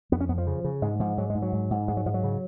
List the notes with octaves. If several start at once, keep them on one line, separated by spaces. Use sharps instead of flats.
F2 B3
C#4
F2 B3
F3
C#3
C#3
G#2 G#3
G#2 F3
G#2 F#3
G#3
G#2
F#3
G#2
G#2
G#2 G#3
F#3
G#2 F3
F#3
C#3